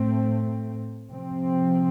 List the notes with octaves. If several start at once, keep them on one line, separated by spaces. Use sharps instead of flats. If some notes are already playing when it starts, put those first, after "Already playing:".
Already playing: A2 A3 C4
C3 F3 C4